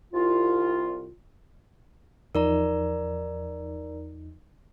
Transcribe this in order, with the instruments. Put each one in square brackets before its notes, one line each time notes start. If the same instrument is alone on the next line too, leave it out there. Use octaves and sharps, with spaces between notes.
[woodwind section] C2 F4
[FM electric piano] E2 F3 D#4 [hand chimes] A#4 D5 A#5